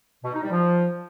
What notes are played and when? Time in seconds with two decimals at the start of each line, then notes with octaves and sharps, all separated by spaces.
0.24 B2
0.33 D#4
0.42 G3
0.51 F3